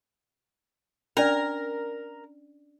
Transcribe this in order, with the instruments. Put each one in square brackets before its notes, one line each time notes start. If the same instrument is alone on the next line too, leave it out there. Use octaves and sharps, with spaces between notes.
[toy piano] C#4 D4 D5 [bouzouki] A#4